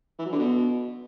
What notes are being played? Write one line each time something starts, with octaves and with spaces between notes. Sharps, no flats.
E3
F#3
D3
B2